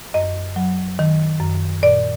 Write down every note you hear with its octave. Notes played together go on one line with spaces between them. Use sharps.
F#2 D#5
F#3
D#3
F#2
A#2 D5